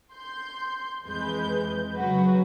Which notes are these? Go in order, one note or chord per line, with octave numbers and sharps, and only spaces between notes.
C6 G6
F2 E3 G#3 B4 G6
C#3 F#3 F#4 B4